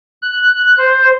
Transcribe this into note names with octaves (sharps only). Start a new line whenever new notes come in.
F#6
C5